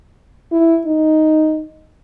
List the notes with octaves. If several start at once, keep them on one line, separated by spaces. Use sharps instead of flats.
E4
D#4